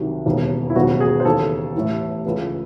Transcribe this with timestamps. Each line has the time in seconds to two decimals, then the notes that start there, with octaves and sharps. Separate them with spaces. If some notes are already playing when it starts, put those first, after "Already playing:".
Already playing: C2 C3 D#3 F#3
0.26 E1 D#2 C#3 E3
0.70 E4
0.75 E1 D#2 C#3 F#3 F#4
1.01 G#4
1.20 C5
1.25 D#2 C#3 E3 A4
1.75 A1 A2 E3
2.25 C#2 C#3 E3